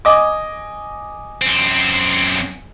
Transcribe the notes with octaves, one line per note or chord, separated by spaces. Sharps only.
D#5 G#5 D6
F#2 C4